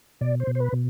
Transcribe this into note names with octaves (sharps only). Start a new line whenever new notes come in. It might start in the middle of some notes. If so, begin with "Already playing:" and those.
B2 D5
C5
B2
C5
B4
B2